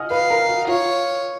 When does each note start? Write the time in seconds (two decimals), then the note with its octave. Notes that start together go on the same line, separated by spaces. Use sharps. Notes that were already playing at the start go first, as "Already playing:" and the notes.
Already playing: D#5 F#5 G#5 D#6 F6
0.10 B4 F5 B5
0.30 A#4 A#5
0.48 F#4 F#5
0.67 F4 C#5 F5